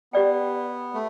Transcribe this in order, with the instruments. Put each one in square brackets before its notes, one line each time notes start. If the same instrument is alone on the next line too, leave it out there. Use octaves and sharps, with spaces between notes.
[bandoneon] B3 [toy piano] G4 D5 G5
[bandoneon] A3